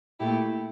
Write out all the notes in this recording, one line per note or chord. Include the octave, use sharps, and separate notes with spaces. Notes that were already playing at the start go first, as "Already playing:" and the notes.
A#2 A3 E4 G4